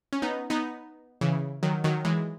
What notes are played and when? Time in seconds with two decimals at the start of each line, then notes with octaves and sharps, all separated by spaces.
0.13 C#4
0.22 B3 D#4
0.50 B3 D#4
1.21 C#3 E3
1.63 D#3 F#3
1.84 D#3 F#3
2.05 E3 G#3